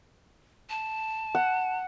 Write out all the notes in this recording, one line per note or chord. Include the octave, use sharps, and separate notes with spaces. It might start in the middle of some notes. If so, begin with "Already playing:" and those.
A5
F#5